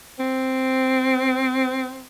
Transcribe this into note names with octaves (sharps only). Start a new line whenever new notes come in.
C4